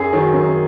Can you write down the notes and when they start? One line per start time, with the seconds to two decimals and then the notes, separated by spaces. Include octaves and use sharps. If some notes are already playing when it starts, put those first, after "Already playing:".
Already playing: F#2 G#4
0.13 D#3 F#3
0.34 F#2